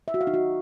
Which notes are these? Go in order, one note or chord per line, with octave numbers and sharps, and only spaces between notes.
E5
F#4
F5
D#4
F#4